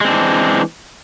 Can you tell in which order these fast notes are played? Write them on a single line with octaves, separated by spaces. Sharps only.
G#3 C4 D4 E3